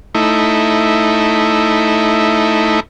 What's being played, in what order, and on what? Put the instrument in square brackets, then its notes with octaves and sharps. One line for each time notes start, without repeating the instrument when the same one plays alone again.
[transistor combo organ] A3 D#4 E4